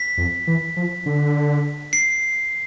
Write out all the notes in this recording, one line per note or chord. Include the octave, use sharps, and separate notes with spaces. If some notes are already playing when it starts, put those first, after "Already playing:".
Already playing: B6
F2
E3
F3
D3
C7